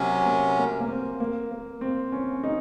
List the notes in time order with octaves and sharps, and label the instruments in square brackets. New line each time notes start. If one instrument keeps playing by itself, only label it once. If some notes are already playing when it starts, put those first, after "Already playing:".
Already playing: [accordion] C3 F#3 C#4 [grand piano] A#3
[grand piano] A#3
A#3
A#3
C4
A#3
A#3
C4
C#4
D#4